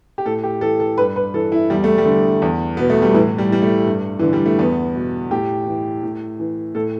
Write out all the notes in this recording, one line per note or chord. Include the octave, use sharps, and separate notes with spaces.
G4
A2 A4
G4
E3 A4
A4
G2 B4
B4
E3 A4
E4
E2 G3
A3
G3
D3
E2
B2 B3
A3
G3
A2 E3
G3
E3 G3
A3
G2
D3 E3
G3
A3
E2 B3
B2
A2 G4
E3
A2
E3
A2 A4